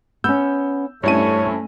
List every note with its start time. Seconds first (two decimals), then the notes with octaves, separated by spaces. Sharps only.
0.24 B3 C#4 E6 G6
1.03 G2 A3 C#4 E4 C5 C#5 A5 D#7